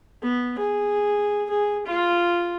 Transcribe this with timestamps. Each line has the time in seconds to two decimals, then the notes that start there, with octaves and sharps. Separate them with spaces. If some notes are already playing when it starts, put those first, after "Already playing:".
0.22 B3
0.59 G#4
1.50 G#4
1.87 F4